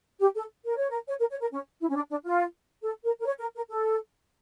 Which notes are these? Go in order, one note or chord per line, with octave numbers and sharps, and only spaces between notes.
G4
A4
A#4
C#5
A#4
C#5
A#4
C#5
A#4
C#4
E4
C#4
D4
D4
F4
A4
A#4
A#4
C#5
A#4
A#4
A4